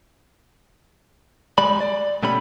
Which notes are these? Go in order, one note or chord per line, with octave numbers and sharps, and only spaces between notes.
G3 G#3 D5 B5
D5
B2 A3 C#4 G4 B5